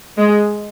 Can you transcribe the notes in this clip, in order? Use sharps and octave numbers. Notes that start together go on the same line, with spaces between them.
G#3